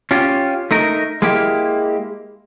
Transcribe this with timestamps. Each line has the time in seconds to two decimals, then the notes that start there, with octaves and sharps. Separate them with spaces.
0.11 C#4 F4 G4
0.71 A3 D#4 A#4
1.22 G#3 A#3 E4 G4